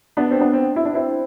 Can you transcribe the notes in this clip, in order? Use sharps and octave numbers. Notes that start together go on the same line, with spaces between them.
B3 D4
C4
B3 D4
C4
E4
D4
C4 E4